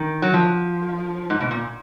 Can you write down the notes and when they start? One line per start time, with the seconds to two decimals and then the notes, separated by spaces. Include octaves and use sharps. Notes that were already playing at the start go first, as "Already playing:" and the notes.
Already playing: D#3
0.22 F#3
0.33 F3
1.30 G#2
1.40 B2
1.51 A#2